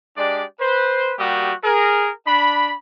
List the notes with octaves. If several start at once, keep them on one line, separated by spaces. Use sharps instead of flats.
G#3 D4 G4 D5
B4 C5
G3 A#3 F#4 G4 D#6
G#4 A#4
D4 B5